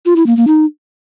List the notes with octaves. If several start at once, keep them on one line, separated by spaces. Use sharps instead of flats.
F4
E4
A#3
A#3
D#4